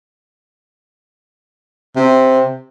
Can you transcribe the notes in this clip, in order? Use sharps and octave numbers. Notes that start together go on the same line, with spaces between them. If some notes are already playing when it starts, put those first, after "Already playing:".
C3